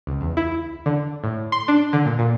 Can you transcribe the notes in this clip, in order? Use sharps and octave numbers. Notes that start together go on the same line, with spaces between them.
C#2
E2
E4
D3
A2
C6
D4
D3
A#2
A#2